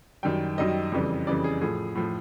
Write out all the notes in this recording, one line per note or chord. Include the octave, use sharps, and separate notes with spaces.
F#2 D#3 G3 G5
F#2 D#3 G3 D#5
F2 C#3 E3 G3
F2 C#3 E3 G3 D5
G#4
A2 F3 G#4
A2 F3